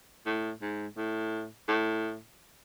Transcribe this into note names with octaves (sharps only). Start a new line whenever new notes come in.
A2
G#2
A2
A2